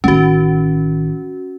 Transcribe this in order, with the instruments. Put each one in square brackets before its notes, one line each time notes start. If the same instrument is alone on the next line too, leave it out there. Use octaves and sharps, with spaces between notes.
[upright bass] A1 D#3 [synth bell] C#4 F#4